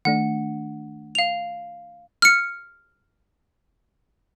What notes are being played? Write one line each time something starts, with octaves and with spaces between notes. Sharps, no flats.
D#3 A3 D4 F#5
F5 F7
F6 C#7